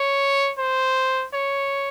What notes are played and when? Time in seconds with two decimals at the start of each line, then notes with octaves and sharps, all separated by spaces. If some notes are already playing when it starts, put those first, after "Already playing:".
Already playing: C#5
0.58 C5
1.33 C#5